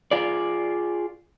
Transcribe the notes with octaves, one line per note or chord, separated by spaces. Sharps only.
F4 G#4 D5